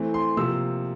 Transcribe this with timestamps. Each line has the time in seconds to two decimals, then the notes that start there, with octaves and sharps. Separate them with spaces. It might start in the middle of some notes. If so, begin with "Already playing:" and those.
Already playing: E3 A3 C4
0.14 C6
0.37 C3 F3 A#3 E6